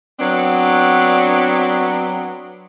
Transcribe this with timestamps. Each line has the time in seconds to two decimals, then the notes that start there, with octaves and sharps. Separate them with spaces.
0.19 F#3 B3 C4 D4